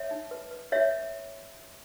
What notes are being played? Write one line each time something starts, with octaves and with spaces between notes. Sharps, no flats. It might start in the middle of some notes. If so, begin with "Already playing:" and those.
Already playing: C#5 E5
D#4
B4
B4
B4 C#5 E5